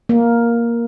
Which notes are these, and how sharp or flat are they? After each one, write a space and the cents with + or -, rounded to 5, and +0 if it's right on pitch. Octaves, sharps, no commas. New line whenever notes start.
A#3 +5